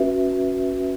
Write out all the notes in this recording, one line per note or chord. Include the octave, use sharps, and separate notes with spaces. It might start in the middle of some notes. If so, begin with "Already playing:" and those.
Already playing: C#4 F#4 B4 E5